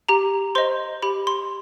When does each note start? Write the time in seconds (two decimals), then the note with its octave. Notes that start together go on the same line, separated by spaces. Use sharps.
0.09 G4 A#5
0.55 C5 D#5 C6
1.02 G4 B5
1.27 C6